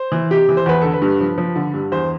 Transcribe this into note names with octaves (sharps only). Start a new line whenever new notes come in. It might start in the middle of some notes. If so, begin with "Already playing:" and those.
Already playing: C5
E3
C3 G4
E3
C5
E2 B4
D3 A4
B4
G2
F3
F3
D3
G2
E2 C5